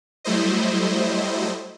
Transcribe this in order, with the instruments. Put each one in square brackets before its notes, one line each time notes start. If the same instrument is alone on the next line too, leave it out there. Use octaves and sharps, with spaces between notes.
[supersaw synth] F#3 G3 A3 E4 C5 D#5